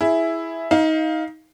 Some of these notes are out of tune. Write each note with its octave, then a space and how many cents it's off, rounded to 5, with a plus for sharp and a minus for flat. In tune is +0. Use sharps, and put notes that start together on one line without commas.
E4 +0 G#4 +0
D#4 +25 F5 +0